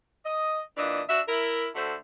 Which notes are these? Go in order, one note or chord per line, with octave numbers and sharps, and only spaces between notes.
D#5
A#2 E3 D4 D#5
D4 F#4 E5
E4 A#4
D3 A3 F#4 C5